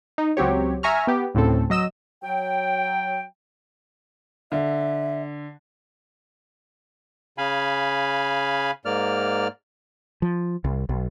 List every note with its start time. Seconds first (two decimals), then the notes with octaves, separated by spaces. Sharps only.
0.18 D#4
0.37 C#2 F#3 C4 G4 C#5
0.83 E5 G#5 A#5 C#6 F6
1.07 B3 G4
1.35 D2 A2 C#3 C4 A4
1.70 F#3 D#5 E6 E7
2.23 F#3 G5
4.52 D3 E5
7.38 C#3 F5 G#5 B5
8.85 G#2 A#3 D5 F6
10.22 F3
10.64 C2
10.89 B1